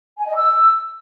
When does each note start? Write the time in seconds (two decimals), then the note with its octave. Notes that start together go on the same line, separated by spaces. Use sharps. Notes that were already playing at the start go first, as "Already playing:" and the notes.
0.18 G#5
0.26 D#5
0.35 E6